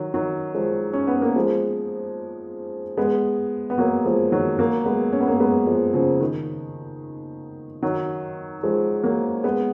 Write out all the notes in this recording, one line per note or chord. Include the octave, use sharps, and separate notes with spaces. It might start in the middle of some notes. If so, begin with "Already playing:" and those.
Already playing: D#3 F#3
D#3 F#3
F3 G#3
C#4
B3
A#3
F3 G#3
G#3 B3
B3
F#3 A#3
F3 G#3
D#3 F#3
F#3 A#3
G#3 B3
C#4
B3
A#3 C#4
G#3 B3
F3 G#3
C#3 F3
D#3
D#3 F#3
F3 G#3
F#3 A#3
G#3 B3